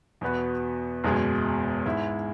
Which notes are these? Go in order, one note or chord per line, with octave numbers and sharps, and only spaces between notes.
E2 B2 B3 F#4 B4
F#1 E2 B2 G#3
G#2 G#3 E4